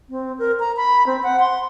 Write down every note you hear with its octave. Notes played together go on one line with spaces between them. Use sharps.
C4
A#4
A#5
B5
C4
F#5
C6